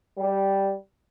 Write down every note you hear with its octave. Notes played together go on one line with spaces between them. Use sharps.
G3